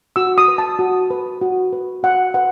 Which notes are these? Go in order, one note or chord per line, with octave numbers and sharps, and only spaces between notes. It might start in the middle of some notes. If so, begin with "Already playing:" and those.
F#4 E6
D#6
B4
A5
F#4
B4
F#4
B4
F#4 F#5
B4 F#5